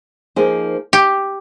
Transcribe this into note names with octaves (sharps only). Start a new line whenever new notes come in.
F3 A#3 D#4 G#4 C5
G4